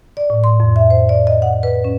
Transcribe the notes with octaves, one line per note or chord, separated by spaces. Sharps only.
D5
A2
C6
F2
E5
C5
D5
D#5
F#5
B4
C#4